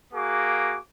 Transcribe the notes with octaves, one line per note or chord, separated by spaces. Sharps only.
A#3 F#4 G#4 D6